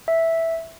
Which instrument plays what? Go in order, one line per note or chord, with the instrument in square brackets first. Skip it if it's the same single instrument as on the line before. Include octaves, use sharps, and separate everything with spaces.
[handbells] E5